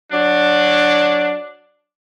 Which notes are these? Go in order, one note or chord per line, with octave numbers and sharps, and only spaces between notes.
F#3 D4